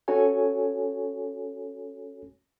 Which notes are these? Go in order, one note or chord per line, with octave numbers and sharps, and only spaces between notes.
C#4 F#4 A4 C#5 G#5